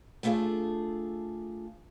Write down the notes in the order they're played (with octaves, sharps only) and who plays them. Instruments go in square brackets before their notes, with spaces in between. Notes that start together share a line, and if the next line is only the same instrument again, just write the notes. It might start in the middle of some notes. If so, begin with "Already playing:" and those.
[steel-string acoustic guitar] A3 B3 D4 F4 G#4 A4